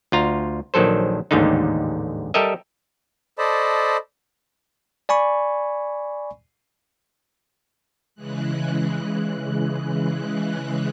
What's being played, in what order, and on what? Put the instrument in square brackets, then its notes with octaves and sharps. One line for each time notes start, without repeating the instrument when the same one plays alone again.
[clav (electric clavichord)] D2 F4 A#5
A#1 D#3 F#3 A4 C5
A1 D#2 G#2 D3 D#4
G3 G4 A4 A#4 D#5 E5
[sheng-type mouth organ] A4 C5 D5 D#5 A5 B5
[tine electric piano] D5 G#5 B5 C#6
[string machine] C#3 E3 G#3 F#6